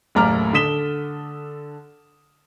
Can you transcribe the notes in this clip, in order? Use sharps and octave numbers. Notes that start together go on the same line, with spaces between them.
F#1 D#2 A2 A#5 D6 F6
D3 A4 D#6 B6 E7 G7